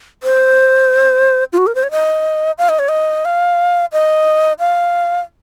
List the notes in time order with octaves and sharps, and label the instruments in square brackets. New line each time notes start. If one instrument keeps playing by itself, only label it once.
[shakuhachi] C5
F4
F#4
A#4
C5
C#5
D#5
F5
D#5
C#5
D#5
F5
D#5
F5